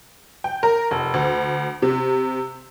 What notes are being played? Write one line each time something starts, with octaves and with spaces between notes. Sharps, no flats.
G5
A#4
F1
D2
C3